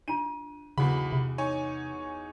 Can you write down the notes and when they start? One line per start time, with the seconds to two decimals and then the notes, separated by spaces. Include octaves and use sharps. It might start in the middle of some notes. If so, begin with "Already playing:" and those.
0.08 D4 F4 D#7
0.78 B1 E2 C#3 F#4 B5
1.13 C3
1.38 D#4 C#5 G#5